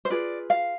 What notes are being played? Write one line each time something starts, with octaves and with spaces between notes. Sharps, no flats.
C5
F4 G#4 B4 D5
F5